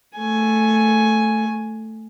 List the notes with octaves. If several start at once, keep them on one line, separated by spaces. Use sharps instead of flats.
A3 G#5